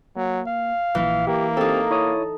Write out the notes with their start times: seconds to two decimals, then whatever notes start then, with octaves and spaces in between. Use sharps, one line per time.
0.16 F#3 A#3
0.47 F5
0.95 A#1 A#2 E3
1.27 A#3 G4
1.57 C4 D#4 G4 A4
1.90 E4 C#5 D#6